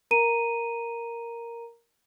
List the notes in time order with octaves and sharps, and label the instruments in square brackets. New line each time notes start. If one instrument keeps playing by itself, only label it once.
[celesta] A#4 A#5 D#7